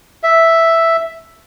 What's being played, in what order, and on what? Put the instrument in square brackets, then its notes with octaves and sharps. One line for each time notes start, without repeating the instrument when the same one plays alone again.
[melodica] E5